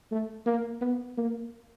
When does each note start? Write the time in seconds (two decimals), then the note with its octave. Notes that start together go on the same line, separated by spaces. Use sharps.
0.12 A3
0.46 A#3
0.81 B3
1.17 A#3